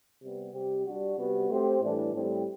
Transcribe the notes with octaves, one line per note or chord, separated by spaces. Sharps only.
C3 G3 B3
C3 G3 C4 G4
G3 D4 F#4
C3 G3 B3 F#4
A3 C4 G4 C5
A2 E3 G3 D4
A2 G3 C4